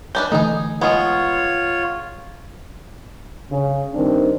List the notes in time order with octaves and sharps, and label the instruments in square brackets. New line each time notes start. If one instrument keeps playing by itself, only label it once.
[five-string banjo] C#4 D4 B4 [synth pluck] G6
[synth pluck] D3 E3 A3 [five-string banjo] D#4 G#4
[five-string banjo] G#3 B3 [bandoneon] F4 C#5
[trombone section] C#3
G2 D#3 C4 D4